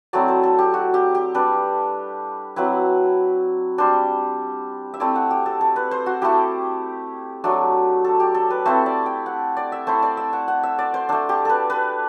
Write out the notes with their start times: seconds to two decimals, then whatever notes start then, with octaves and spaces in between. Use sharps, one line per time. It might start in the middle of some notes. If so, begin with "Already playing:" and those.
0.13 F#3 A3 C4 E4 D5
0.28 C5
0.43 A4
0.59 G4
0.74 F#4
0.94 G4
1.15 G4
1.34 G3 D4 B4
2.56 F#3 C4 E4 B4
3.78 G3 D4 C5
4.94 E5
5.00 A3 C4 E4 D5
5.15 F#5
5.30 G4
5.46 A4
5.61 A4
5.76 B4
5.91 C5
6.06 F#4
6.22 A3 E4 G4
7.44 F#3 A3 D4
8.05 A4
8.20 G4
8.34 A4
8.50 B4
8.65 A3 C4 E4 C5
8.86 D5
9.06 G5
9.26 F#5
9.57 D5
9.72 E5
9.87 A3 E4 C5
10.02 D5
10.17 E5
10.33 F#5
10.48 F#5
10.63 E5
10.79 D5
10.94 C5
11.09 A3 D4 A4
11.29 G4
11.45 A4 B4
11.70 B4